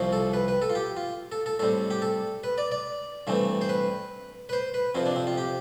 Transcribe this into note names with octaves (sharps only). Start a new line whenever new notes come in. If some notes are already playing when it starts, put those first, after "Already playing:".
Already playing: C2 C3 F3 C4
A4
B4
B4
A4
F4
G4
F4
A4
A4
A2 G3 C4 A4
G4
A4
B4
D5
D5
G2 E3 A3 C4
C5
B4
B4
C5
B4
F2 C3 F3 C4
D4
C4
F4
G4